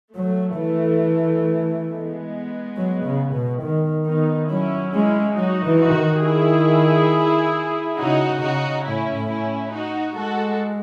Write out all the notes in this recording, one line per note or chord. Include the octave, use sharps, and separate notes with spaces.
F#3 A3
E3
G#3 B3
F#3
C#3
B2
D#3
D#3 B3 D#4
F#3 C#4 E4
G#3 C#4 E4
F#3 D#4 F#4
E3
D#4 F#4
D#3
E4 G#4
C#3 D#4 F#4
C#3 D#4 F#4
A2 C#4 E4
A2
C#4 E4
D#4 F#4
G#3 F#4 A4